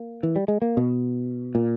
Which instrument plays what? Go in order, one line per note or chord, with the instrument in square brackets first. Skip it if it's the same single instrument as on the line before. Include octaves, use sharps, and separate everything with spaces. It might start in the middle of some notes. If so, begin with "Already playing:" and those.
Already playing: [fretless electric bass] A#3
E3
G3
G#3
A#3
B2
A#2